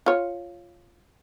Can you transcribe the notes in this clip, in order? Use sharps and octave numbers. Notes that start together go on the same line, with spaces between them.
F4 C#5